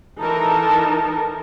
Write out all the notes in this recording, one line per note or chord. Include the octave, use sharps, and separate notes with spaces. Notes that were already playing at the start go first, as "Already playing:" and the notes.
E3 D#4 A4 A#4 A5 A#5